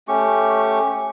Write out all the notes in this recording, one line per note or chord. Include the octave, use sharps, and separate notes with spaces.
A3 C#4 G4 C#6